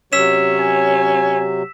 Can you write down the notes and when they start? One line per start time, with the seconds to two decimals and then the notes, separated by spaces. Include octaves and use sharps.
0.13 C3 F#3 C#4 E6 B6 E7
0.59 G#5